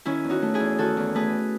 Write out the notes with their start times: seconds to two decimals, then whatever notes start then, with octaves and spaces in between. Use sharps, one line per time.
0.05 D#3 C#4 E4
0.24 E2
0.30 D#4 F#4
0.42 A3
0.54 E4 G#4
0.60 E2
0.78 D#3 F#4 A4
0.97 E2
1.15 A3 G#4 B4